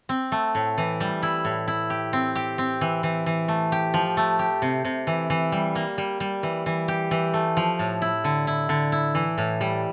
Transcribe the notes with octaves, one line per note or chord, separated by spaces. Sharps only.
C4
A3
A2
E3
G3
E4
A2
E4
G4
C4
G4
C4
E3
E3
E3
A3
G4
F3
A3
G4
C3
C3
E3
E3
G3
A#3
G3
G3
E3
E3
G4
E3
A3
F3
A2
E4
D3
E4
D3
E4
E3
A2
G3